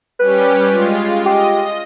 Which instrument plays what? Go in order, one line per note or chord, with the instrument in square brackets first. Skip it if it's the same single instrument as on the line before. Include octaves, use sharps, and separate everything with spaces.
[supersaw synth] G3 C#4 G4 [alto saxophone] B4
[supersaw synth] G#3 F4
[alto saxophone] G4 [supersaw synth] D#5